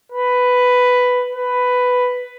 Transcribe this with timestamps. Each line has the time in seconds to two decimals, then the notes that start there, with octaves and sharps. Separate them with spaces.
0.12 B4
1.35 B4